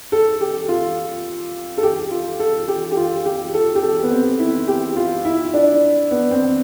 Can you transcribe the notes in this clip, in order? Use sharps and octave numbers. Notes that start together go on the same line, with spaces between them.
A4
G4
F4
A4
G4
F4
A4
G4
G4
F4
G4
A4
G4
A4
B3
C4
E4
G4
F4
E4
D4
B3
C4